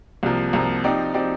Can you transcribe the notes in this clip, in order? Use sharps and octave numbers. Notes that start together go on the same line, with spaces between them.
C2 C3 F3 A#3
C2 C3 F3 A#3
F3 C4 D#4 G4 D5
F3 C4 D#4 G4 D5